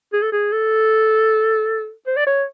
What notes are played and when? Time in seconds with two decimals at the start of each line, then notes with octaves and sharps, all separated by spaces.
0.13 G#4
0.22 A4
0.32 G#4
0.52 A4
2.07 C5
2.16 D5
2.27 C#5